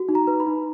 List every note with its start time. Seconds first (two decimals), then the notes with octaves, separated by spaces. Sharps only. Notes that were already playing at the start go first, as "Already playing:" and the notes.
Already playing: F#4
0.09 D#4
0.15 A#5
0.27 B4
0.40 B5
0.46 D#4